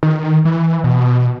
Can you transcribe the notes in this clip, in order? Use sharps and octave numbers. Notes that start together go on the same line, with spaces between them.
D#3
E3
B2